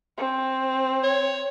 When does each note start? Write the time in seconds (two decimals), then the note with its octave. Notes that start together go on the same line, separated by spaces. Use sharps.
0.18 C4
1.04 C#5